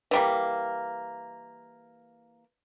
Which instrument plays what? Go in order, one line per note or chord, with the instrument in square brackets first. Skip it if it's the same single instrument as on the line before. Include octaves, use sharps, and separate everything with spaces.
[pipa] E3 G3 A#3